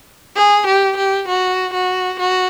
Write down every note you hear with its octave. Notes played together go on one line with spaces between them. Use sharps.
G#4
G4
G4
F#4
F#4
F#4